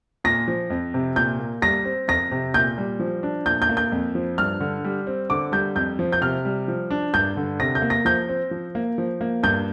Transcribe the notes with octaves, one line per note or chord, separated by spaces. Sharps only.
A#2 A#6
F3
F2
C3
A#2 G6
A#3
G3 A#6
C4
F2 A#6
C3
A#2 G6
G3
F3
D4
A#2 G6
G6
A#3
G6
F2
F3
G2 F6
D3
G3
C4
D3 D6
G3 G6
F2 G6
F3
G6
C3 F6
G3
F3
D4
G2 G6
D3
C3 A#6
G6
A#3
A#6
F3 G6
C4
F3
A#3
F3
A#3
G2 G6